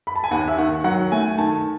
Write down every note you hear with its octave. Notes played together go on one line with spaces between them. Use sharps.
B5
A5
G#5
D#2 F#5
E5
D#3 F#5
F#3 F#5
A3 G#5
D#3 A5